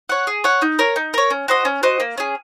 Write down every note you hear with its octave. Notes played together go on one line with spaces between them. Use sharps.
C#5 F#5
G#4
C#5 F#5
D#4
A#4 C#5
D#4
A#4 C#5
C#4
F#4 C5 D#5
C#4
F#4 C5 D#5
A#3
C#4 G#4